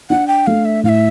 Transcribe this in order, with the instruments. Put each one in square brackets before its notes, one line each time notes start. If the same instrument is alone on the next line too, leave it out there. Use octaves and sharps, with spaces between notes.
[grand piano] D4 [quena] F#5
[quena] G5
[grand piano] A3 [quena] F5
[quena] E5
[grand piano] A2 [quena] F5
[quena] E5